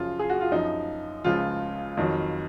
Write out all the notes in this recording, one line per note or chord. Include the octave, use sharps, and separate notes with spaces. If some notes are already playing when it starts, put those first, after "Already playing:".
Already playing: F#2 C#3 F3 F4
G#4
F#4
F4
F#2 F3 D#4
C#2 C#3 F3 F4
F2 D#3 F#3